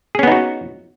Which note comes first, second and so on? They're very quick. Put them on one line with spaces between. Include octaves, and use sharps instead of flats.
G#4 C#4 B3 D#4 F#4